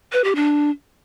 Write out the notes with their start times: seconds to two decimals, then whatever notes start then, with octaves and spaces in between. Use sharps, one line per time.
0.13 B4
0.24 G4
0.36 D4